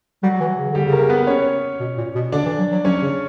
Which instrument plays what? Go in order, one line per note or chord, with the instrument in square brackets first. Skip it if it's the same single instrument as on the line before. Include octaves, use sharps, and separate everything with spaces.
[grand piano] F#3 F#4 [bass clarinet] G3
[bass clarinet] E3
C#3
[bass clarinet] D3 [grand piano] G3 G4
[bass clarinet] C#3
[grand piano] A#3 A#4
B3 B4
C#4 C#5
[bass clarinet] B2
A#2
B2
[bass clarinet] D3 [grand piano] D4 D5
[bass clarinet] E3
F#3
F#3
[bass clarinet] F#3 [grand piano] C#4 C#5
[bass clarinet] C#3